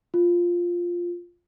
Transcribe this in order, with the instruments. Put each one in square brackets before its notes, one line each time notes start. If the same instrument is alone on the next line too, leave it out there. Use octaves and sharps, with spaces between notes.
[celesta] F4